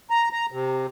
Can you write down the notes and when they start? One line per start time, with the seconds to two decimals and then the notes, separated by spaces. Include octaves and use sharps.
0.10 A#5
0.33 A#5
0.52 C3